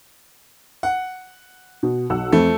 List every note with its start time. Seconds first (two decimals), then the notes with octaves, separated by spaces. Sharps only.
0.83 F#5
1.83 B2
2.10 B1 F#5 E6
2.33 F2 A3